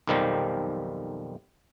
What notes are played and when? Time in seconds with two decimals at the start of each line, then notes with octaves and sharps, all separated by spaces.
0.07 B1 F2 D#3 F3 G3 G4